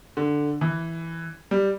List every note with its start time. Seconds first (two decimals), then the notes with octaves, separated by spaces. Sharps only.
0.17 D3
0.61 E3
1.51 G3